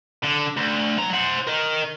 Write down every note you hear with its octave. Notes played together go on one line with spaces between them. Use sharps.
D3
D2
F#3 A#5
C5 F#5
A#4 D#5